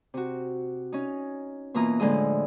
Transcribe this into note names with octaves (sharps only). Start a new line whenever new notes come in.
C3 F#4
C#4 D#4
B2 E3 A#3 F4 A#5 D#6
A2 D3 F3 G#3 D#5